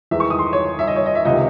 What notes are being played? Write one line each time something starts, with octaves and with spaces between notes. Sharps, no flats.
E2 D#3 G#3 E5
C#6
D#6
C6
C#5
E5
D#5
C#5
D#5
E5
C#2 C3 D#3 D#5